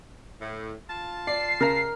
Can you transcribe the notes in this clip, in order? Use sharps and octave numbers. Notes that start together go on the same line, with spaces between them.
A2
F4 A5
D5 C7
C#3 A#4 A#5